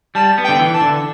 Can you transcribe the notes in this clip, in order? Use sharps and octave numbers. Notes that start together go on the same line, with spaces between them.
G3 A5
B3
G5
D3
E3
A5
D3